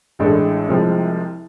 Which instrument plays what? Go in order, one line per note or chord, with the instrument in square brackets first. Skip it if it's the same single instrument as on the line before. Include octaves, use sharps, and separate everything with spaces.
[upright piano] A1 A2 G#3 D4 A4
C2 C3 F3 G#3